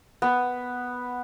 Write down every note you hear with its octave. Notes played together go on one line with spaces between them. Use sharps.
B3